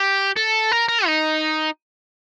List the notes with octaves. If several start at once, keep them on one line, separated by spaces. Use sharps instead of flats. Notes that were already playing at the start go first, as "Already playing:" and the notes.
Already playing: G4
A4
A#4
A#4
D#4